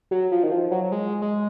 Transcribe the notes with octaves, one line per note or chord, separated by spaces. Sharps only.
F#3
F3
D#3
F3
F#3
F#3
G#3
G#3